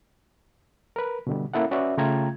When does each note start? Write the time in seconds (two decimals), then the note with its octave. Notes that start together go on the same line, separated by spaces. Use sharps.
0.96 A#4 B4
1.27 B2 D3 G3
1.54 A#3 C#4 E4 A4 F#5
1.71 C#4 F#4 B4 D5 E5
1.98 C#3 A3 F4 G5 A#5 G#6